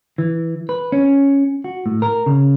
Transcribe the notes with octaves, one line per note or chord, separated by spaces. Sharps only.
E3
B4
C#4
F#4
A2
A#4
C#3